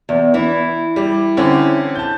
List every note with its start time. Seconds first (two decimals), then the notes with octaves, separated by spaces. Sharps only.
0.09 E2
0.34 E3 E4
0.96 G3
1.37 D3 C4 C#4
1.96 A5 G6